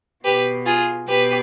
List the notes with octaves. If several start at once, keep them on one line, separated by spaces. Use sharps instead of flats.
B2 G4 B4
F4 G#4
B2 G4 B4